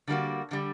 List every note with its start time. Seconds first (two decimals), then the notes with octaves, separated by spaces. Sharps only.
0.08 D3 G3 A#3 F#4
0.51 D3 G3